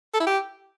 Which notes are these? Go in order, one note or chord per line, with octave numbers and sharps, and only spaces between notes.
A4
E4
G4